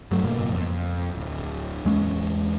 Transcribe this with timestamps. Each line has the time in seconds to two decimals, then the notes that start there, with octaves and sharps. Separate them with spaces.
0.11 G2 F#3 A3
0.23 F#1 G#2 B2 A#3
0.52 F2
1.15 D1
1.85 E2 G#3 C#4